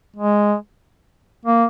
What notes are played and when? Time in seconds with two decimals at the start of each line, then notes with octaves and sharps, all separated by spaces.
0.17 G#3
1.46 A#3